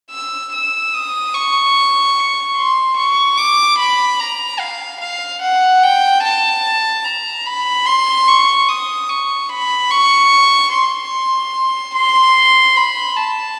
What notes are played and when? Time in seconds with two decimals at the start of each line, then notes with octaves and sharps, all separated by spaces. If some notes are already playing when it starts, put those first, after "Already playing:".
0.11 E6
0.53 E6
0.94 D#6
1.34 C#6
2.57 C6
2.97 C#6
3.37 D6
3.79 B5
4.20 A#5
4.60 F5
5.01 F5
5.42 F#5
5.83 G5
6.23 A5
7.05 A#5
7.46 B5
7.86 C6
8.28 C#6
8.69 D#6
9.09 C#6
9.49 B5
9.91 C#6
10.73 C6
11.95 C6
12.77 B5
13.17 A5